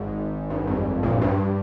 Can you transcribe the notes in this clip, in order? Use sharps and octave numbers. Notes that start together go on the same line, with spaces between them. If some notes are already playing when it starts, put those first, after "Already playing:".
Already playing: G#1 G#2
G2
F2
A#1 A#2
G2